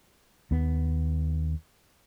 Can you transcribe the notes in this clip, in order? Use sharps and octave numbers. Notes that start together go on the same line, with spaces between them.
D#2 B3